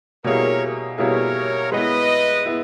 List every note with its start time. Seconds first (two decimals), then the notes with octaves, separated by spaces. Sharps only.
0.24 B2 G3 A#3 E4 G#4 A#4 C#5
0.98 B2 G3 A#3 E4 G#4 A#4 C#5
1.71 G#3 B3 E4 B4 D#5
2.46 B3 E4